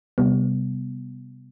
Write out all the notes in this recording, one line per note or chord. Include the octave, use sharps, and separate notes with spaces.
C3 G3 B3